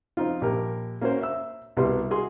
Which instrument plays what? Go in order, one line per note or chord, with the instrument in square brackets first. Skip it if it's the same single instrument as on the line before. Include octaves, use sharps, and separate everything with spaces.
[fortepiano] F3 C4 D#4 F4
A#1 G4 A#4
A#3 C#4 F#4 A#4 C5
E5 E6
C2 B2 G3 B4 C6
F#4 G#4 C6